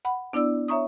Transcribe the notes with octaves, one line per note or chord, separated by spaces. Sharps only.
F#5 B5
B3 D4 E4 D5 E6
C#5 E5 A#5 C#6 D#6